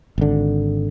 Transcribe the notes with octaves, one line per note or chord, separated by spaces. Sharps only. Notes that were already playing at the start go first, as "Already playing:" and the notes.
G#1 D3